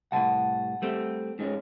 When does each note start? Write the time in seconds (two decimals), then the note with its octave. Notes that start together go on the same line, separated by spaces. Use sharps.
0.12 C2 A2 F#5 A5
0.82 G3 A3 C4
1.39 G#2 G#3 C#4